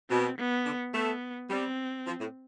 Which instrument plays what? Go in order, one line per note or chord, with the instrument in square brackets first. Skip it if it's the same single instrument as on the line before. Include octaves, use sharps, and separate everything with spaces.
[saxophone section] B2 [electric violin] C4
[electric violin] B3
[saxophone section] D3
[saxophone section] A3 [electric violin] B3
[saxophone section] G3 [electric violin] C4
[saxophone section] F3
A2